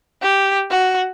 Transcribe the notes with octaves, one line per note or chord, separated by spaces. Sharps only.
G4
F#4